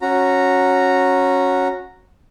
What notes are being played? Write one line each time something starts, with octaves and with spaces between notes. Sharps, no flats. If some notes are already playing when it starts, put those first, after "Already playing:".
C#4 F#4 A#5